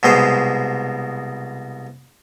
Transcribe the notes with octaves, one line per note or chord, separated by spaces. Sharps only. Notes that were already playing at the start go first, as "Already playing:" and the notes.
C2 B2 G#3 C5